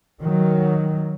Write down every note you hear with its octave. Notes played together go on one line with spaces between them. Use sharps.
D#3 F#3